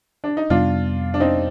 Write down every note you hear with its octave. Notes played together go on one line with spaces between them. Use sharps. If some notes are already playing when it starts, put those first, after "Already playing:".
D4
D#4
F2 C3 G3 B3 D4 F4
D4
C4 D#4